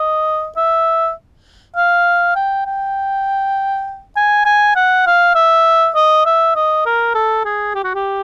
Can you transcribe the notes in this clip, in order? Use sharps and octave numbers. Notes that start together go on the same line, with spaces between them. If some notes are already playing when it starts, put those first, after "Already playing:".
Already playing: D#5
E5
F5
G5
G5
G#5
G#5
F#5
F5
E5
D#5
E5
D#5
A#4
A4
G#4
G4
F#4
G4